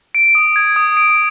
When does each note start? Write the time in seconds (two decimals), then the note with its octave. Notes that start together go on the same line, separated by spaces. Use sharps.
0.15 D7
0.35 D#6
0.56 G#6
0.76 D#6
0.97 D7